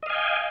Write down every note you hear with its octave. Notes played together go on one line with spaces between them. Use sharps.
D#5 F5 G5 G#5